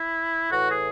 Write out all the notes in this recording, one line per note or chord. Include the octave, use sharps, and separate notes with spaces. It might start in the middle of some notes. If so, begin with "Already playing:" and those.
Already playing: E4
A2 E3 F#4
G#4